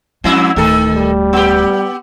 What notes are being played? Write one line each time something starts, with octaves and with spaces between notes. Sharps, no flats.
F2 G#3 E4
D1 D2 D#3 A4
G3
B3 G4